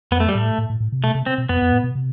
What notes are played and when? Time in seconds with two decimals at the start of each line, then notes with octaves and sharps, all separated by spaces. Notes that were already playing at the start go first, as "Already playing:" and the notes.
0.11 F2 B3
0.20 A3
0.29 G3
0.35 A2 A3
0.58 A2
0.69 A2
0.80 A2
0.92 C3
1.03 B2 A3
1.15 C3
1.26 C4
1.38 B2
1.49 F2 B3
1.62 F2
1.72 A2
1.84 B2
1.95 C3